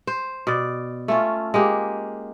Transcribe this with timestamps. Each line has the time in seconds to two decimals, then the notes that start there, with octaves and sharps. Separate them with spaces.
0.07 C5
0.47 B2 D5
1.08 A3 C#4 F4
1.54 G#3 A#3 G4